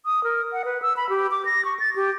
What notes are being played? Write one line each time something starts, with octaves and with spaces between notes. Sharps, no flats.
D#6
A#4
F#5
B4
E6
B5
G4
D6
A#6
C#6
A6
G4